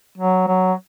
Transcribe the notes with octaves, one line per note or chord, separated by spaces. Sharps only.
F#3
F#3